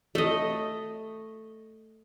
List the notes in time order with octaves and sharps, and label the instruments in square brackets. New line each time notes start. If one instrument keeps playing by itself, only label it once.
[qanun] A3 D#5